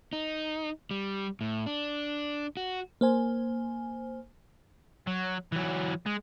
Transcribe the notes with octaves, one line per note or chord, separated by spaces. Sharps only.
D#4
G3
A2
D4
F#4
A#3 C5 G#5
F#3
E3 F#3
G#3